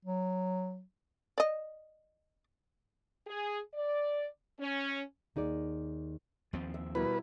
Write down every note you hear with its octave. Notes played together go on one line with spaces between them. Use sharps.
F#3
D5 D#5
G#4
D5
C#4
D#2 D#4 G#4 D5
D#2 F3 C4
E5
B2 G3 E4 A#4 B4